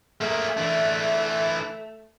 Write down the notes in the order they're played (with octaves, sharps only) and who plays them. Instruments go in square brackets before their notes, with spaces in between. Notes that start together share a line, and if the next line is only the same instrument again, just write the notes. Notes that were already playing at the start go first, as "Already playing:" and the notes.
[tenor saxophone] A3 [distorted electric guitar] A#3 G#4
[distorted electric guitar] E3 D4